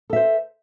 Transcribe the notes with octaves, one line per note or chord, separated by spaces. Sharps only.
A4 C5 E5